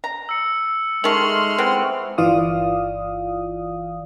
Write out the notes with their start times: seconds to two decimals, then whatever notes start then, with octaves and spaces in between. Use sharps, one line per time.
0.04 A#5
0.29 E6 C#7
1.04 D#3 G#3 A3 C6 C#6 F6 F7 F#7
1.58 E3 B3 C4
2.18 G1 E3 F4 D5 F5 D#6